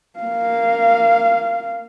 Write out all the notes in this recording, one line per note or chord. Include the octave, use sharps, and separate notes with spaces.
A#3 F5